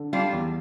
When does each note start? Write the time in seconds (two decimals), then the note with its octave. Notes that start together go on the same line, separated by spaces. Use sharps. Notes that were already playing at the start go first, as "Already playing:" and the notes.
Already playing: D3
0.13 G3 D4 F4
0.33 E2